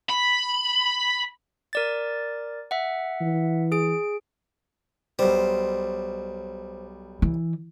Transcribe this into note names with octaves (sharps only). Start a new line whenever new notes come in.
B5
A#4 D5 A6
E5 F#5
E3
G#4 D7
B1 G3 C5
E3